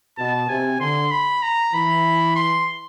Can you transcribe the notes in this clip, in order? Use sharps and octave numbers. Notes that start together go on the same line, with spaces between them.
B2 A5
C3 G#5
D3 C6
B5
A#5
E3 B5
C6